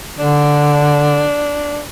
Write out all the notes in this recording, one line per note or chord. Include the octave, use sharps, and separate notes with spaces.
D3 D4